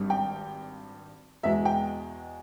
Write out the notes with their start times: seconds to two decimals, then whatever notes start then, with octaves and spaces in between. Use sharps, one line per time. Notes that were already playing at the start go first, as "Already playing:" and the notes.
Already playing: G#1 G2 G3
0.10 G5
1.43 E2 B2 G#3 E5
1.65 G5